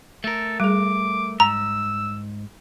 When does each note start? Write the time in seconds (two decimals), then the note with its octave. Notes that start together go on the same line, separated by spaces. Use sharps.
0.24 A3 A4 A#4
0.60 G3 G#4 D6
1.40 G#2 A#5 E6